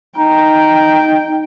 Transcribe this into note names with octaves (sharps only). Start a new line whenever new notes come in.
D#4 G5 A#5